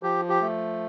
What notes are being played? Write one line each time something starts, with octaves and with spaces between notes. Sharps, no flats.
F3 G4
G4
A3